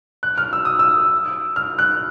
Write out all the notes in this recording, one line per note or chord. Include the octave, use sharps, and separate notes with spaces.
F#6
F6
E6
D#6
E6
F6
F#6